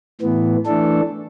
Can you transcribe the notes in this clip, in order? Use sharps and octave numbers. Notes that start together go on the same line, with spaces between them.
A2 E3 B3
E3 A3 D4 A4